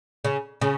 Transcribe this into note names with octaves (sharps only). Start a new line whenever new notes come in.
C#3
C#3